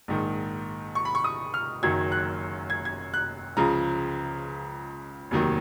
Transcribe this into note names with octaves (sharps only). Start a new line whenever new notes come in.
A#1 G#2 D#3
C#6
B5
C#6
D#6
F6
F#1 F#2 D#3 F#3 G#6
F#6
G#6
G#6
F#6
C#2 C#3 F3 A#5
F1 D#2 D#3 F#3